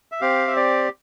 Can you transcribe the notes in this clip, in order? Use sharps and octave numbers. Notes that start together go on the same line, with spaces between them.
E5
C4 G4 F5
E5
D5